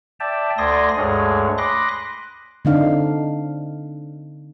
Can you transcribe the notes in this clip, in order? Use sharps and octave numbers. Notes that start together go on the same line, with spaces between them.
D5 E5 G5 A5
D2 D5 G#5 C6 D#6 A#6
D2 G2 G#3 G#4 C#5
B5 C6 D6 D#6 F#6 A#6
D3 C4 D4 D#4 F5